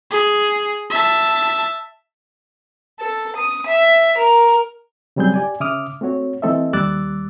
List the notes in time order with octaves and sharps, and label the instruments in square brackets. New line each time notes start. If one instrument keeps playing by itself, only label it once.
[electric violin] G#4
E5 A5
[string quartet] A4
D#6
E5
A#4
[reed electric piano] C#3 F#3 G3 C4 G#4 G6
G4 D5 G#5
C#3 E5 D6 D#6 F6
A3 C4 F#4 C#5
E3 A3 C4 A4 D#5 E5
D#2 G3 D6 E6 F#6 A6